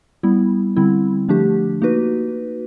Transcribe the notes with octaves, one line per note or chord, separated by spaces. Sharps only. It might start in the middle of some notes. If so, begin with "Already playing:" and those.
G3 B3 E4
D3 G3 C4 E4
D3 F3 A3 D4 G4
A#3 D#4 F#4 B4